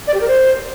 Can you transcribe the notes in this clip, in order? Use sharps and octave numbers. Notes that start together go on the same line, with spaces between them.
D5
G4
A#4
C5